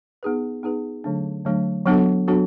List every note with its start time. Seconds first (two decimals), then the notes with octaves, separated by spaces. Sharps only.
0.23 B3 D#4 G#4 B4
0.63 B3 D#4 G#4 B4
1.04 D3 F#3 A3 D4
1.45 D3 F#3 A3 D4
1.86 F#3 B3 D4 F#4 A4
2.28 F#3 B3 D4 F#4 A4